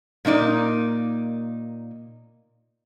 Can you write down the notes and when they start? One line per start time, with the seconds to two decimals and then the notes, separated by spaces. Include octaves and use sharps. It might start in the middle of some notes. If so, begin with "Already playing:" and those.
0.25 A#2 A#3 D#4 D5